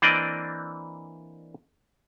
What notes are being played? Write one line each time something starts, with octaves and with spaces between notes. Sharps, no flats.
E3 A#3 C4 D4 D5 D#5